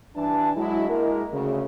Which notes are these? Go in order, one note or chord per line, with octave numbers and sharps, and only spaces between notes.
G2 E3 D4 A5
F#3 G#3 E4
G#3 A#3 E4 A#4
D2 C#3